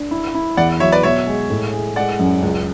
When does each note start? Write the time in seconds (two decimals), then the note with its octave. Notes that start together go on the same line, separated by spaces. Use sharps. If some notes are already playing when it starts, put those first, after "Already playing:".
Already playing: D4
0.11 E4
0.35 E4
0.57 E2 D5 F#5
0.80 F#3 C#5 E5
0.92 B4 D5
1.03 B2 C#5 E5
1.27 G#3
1.50 A2
1.73 G#4
1.96 G#3 D5 F#5
2.19 F#2
2.42 C#2